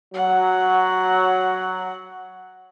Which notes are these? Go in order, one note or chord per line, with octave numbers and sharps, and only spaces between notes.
F#3 F#5